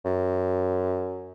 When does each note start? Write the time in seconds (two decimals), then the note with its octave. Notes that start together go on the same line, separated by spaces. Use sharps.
0.05 F#2